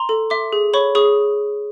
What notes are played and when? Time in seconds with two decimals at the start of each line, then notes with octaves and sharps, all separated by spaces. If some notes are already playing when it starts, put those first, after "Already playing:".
Already playing: A#5 C6
0.09 A4
0.30 E5 C6 D6
0.53 G#4
0.74 C#5 B5 C#6
0.95 G#4 C#6 D#6